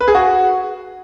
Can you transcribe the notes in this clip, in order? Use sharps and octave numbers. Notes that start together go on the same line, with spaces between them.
B4
G#4
F#4